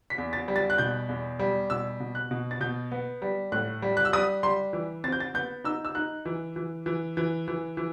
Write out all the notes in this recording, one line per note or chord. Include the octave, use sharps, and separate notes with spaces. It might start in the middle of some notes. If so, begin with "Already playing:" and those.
B6
E2
A6
G3
A6
F#6
B2 G6
E2
G3
B2 E6
B2
F#6
B2
A6
B2 G6
B3
G3
A2 F#6
G3
F#6
E6
G3 D#6
G3 C6
E3
C4 A6
G6
A6
B3 G6
D#4 E6
E6
D#4 F#6
E3
E3
E3
E3
E3
E3